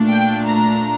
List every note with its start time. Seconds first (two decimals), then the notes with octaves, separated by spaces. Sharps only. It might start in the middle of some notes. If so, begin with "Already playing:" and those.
Already playing: A#2 A3 D4
0.09 G5
0.45 A#5